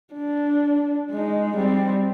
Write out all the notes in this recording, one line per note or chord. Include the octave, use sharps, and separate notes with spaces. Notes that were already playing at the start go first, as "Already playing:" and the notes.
D4
G#3 D#4
G3 C4